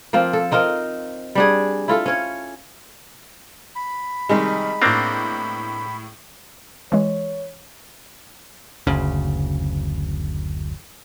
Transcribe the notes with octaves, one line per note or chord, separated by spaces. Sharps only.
F3 A#3 C4 F4
A4
C4 D#4 F4 A#4
G3 D4 G#4
E4 F4 A4
C#4 C#5
B5
C3 D#3 G3 G#3 D#4
A2 A#3 C4 D4 G6 A#6
E3 G#3 C#5
F#1 D2 C#3